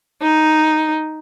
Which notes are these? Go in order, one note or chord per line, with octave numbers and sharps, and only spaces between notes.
D#4